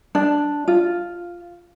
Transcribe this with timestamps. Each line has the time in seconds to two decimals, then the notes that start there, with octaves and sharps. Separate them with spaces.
0.15 D4
0.68 F4